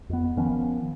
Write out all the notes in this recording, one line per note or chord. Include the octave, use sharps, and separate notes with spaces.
F2 B3
D#3 F3 B3 C#4